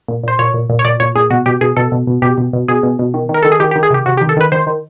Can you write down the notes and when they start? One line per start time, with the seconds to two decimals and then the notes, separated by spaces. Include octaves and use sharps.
0.08 A#2
0.23 A#2 C5
0.39 A#2 C#5
0.54 A#2
0.69 A#2
0.79 C#5
0.85 A#2 D5
1.00 A#2 C#5
1.16 A#2 G#4
1.30 B2 F#4
1.46 B2 G4
1.61 B2 G#4
1.76 B2 A4
1.92 B2
2.07 B2
2.22 B2 G4
2.38 B2
2.53 B2
2.68 B2 G#4
2.83 B2
2.99 B2
3.14 D#3
3.29 D#3
3.34 A#4
3.43 D#3 A4
3.52 G#4
3.60 D#3 G4
3.71 G4
3.76 D#3
3.83 G#4
3.90 C3 G4
4.06 C3 F#4
4.17 G4
4.21 D#3
4.29 A4
4.37 D#3 B4
4.52 D#3 C5
4.67 D#3